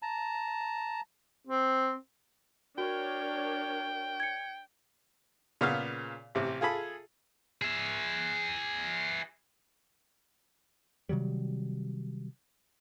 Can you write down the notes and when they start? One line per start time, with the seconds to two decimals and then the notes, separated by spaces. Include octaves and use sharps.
0.02 A5 A#5
1.47 C4
2.78 D4 F#4 A#4 C#5 G5
4.20 G#6 C#7
5.61 A#2 C#3 B3 F5 F6
6.35 A1 C3
6.61 F4 G#4 A4 B5
7.62 G#4 E5
11.09 C3 D#3 F#3 G3